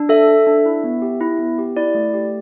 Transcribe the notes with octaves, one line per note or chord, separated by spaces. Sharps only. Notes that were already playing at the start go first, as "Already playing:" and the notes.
Already playing: D4
A4 E5
A4
D4
E4
B3
G4
E4
B3
G4
E4 D5
A3
G4